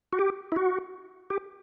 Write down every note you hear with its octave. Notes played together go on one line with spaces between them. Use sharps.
F#4
G4
E4
F#4
G4